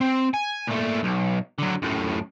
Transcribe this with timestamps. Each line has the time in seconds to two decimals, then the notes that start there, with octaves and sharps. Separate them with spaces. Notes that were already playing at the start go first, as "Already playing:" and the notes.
0.01 C4
0.34 G#5
0.67 A#2 A3
1.03 B1
1.59 D3 F#3
1.82 F#2 A2